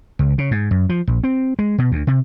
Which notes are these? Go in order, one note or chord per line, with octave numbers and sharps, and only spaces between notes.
C#2
C#3
G#2
F#2
F3
A#1
C4
G#3
B2
D2
C3